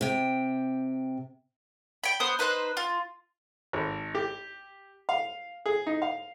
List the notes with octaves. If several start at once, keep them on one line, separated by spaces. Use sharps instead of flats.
C3 G5
G5 B5
B3 C5 D#6
D#4 B4 C5 F#6
F4
G#1
G4
F5
G#4
D#4
F5